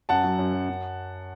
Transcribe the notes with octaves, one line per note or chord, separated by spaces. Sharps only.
F#2 F#5 A5
F#3
F#2
F#3
F#2